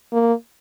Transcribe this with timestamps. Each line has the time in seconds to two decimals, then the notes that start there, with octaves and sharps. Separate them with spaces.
0.13 A#3